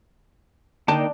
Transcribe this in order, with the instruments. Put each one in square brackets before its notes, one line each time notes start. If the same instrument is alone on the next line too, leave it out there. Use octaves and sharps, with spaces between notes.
[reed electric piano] D3 [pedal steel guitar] A#3 D#4 G5 [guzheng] D4 [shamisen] A5